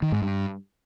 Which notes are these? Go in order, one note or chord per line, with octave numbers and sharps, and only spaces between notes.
D#3
G#2
G2